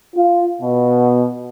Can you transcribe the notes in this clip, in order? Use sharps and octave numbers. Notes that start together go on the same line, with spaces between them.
F4
B2